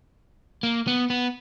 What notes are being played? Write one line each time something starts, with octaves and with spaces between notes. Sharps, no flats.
A#3
B3
B3